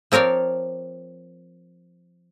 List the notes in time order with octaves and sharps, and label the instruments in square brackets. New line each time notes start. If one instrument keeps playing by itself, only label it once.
[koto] F3 C4 A#4 C#5 D5